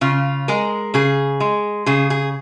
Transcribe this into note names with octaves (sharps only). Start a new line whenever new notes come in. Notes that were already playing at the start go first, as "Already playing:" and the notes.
C#3 F4
G#3 A#4
C#3 G#4
G#3
C#3 G#4
G#4